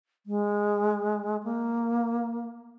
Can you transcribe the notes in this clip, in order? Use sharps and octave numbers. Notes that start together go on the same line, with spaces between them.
G#3
A#3